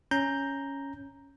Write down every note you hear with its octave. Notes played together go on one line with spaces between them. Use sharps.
C#4 A#5 G6